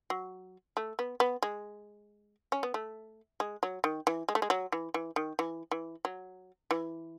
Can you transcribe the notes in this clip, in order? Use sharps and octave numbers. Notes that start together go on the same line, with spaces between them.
F#3
A3
B3
B3
G#3
C#4
B3
A3
G#3
F#3
D#3
E3
G#3
A3
G#3
F#3
E3
E3
D#3
E3
E3
F#3
E3